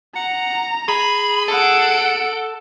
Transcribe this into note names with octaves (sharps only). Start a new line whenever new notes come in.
F#5 A#5
G#4 B5
A4 F#5 D7